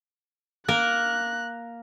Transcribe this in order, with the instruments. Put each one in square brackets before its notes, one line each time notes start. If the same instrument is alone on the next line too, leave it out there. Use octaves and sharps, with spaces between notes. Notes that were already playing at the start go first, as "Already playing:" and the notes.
[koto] A#3 A#4 [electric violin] F#6